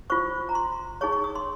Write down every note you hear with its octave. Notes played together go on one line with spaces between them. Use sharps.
F4 C5 C#6
A#5
C6
D#4 G#4 C#5 C#6
C#6
D#6
C6